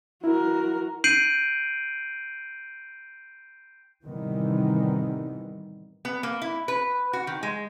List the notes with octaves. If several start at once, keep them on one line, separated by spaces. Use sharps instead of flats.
E4 F#4 A#4
G6 C7 D7 D#7 F#7
A2 C3 D#3 E3 G3 B3
B3
A#3
E4
B4
F#4
D#3
G#3